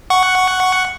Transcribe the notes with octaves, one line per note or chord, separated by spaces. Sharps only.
F#5 C#6